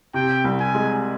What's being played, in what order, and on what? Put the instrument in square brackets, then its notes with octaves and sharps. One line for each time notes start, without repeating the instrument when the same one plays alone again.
[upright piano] C3 [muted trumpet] G5
[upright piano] C2
[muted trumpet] G#5
[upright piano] G#3